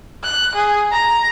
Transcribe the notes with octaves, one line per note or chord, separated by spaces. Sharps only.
F#6
G#4
A#5